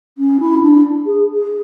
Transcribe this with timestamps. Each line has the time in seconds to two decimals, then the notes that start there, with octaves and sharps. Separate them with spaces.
0.18 C#4
0.40 E4
0.57 C#4
0.62 D4
1.06 G#4
1.33 G#4